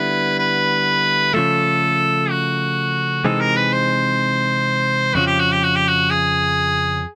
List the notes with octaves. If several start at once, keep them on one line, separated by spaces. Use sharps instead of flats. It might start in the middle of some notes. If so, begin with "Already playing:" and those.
Already playing: D3 G3 B3 E4 B4
B4
C#3 F3 A3 A4
F#4
C3 E3 G#3 C4 D#4 A4
A#4
B4
C5
F2 C#3 F3 F#4
G4
F#4
G4
F#4
G4
F#4
G#4